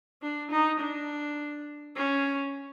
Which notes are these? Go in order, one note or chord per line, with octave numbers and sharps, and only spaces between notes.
D4
D#4
D4
C#4